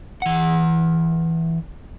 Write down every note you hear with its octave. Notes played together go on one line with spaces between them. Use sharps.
E3 F#5